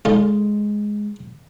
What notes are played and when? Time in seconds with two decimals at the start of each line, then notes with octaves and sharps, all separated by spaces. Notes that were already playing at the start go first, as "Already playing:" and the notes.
0.05 D3 G#3 D#4 F4